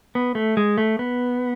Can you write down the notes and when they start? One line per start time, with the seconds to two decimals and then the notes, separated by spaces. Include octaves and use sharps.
0.15 B3
0.35 A3
0.57 G#3
0.78 A3
0.99 B3